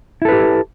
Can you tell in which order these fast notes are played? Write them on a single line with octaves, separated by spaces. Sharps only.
E4 A4 B4 G4